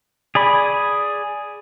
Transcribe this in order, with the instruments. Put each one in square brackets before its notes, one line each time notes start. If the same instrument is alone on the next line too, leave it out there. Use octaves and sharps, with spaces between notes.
[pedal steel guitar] G#4 D5 B5